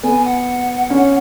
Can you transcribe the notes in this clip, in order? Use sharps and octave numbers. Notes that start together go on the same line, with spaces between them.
B3 G#5
F#5
C#4